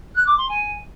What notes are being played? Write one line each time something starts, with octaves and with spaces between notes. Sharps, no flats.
F#6
D6
C6
G#5